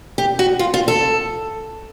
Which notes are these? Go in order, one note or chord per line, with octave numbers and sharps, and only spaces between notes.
G4
F#4
F4
F4
A4